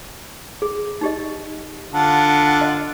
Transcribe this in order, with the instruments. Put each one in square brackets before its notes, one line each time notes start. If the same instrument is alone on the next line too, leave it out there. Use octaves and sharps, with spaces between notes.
[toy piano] G#4
D#4 G4 D#5
[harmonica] D3 F4 F#5 [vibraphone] A5
[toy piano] D#5